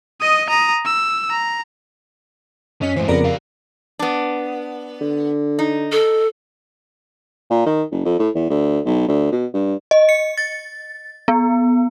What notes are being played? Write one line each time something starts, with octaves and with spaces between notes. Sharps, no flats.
D#5 D#6
A#5 D#6
E6
A#5
F#2 C#4 D#5 B6
G#2 E3 C5
F2 C#3 B3 A#4 D5 A#5
G4 F5
B3 D4
D3
D#4
A4
A#2
D#3
F#1
F2
A2
E2
D2
B1
D2
B2
G2
D#5
C#7
A6
B3